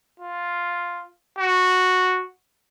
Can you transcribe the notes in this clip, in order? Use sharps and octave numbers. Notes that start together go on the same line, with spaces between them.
F4
F#4